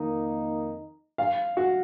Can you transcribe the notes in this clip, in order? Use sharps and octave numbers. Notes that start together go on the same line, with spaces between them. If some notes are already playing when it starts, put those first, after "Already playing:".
Already playing: F2 D#3 A#3 D#4
F5
F#4